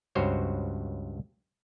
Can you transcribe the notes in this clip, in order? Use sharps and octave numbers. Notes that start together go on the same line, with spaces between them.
C#2 G2 F#4 C5 C#5